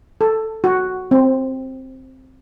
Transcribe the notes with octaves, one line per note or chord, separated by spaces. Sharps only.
A4
F#4
C4